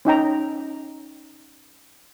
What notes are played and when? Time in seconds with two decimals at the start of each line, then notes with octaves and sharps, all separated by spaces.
0.05 C#4 D#4 G5 A#5